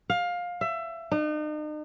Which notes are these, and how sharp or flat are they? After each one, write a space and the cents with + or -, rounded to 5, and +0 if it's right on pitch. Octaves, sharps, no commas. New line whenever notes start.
F5 +20
E5 +25
D#4 -40